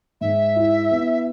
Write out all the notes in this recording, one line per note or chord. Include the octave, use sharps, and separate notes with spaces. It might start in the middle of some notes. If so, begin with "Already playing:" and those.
G#2 E5
E4
B3